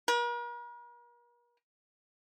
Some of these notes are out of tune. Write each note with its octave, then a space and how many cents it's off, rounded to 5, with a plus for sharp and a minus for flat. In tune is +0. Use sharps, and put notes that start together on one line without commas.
A#4 +45